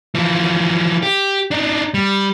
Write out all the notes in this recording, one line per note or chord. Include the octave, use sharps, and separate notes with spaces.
E3 F3
G4
D4 D#4
G3